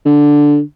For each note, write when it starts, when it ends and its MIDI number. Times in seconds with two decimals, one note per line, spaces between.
0.06 0.60 50